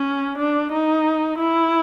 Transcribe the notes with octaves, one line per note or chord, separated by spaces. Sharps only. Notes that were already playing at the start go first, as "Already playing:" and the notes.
Already playing: C#4
D4
D#4
E4